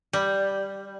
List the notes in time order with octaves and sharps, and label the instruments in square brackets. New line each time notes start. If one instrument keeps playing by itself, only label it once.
[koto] G3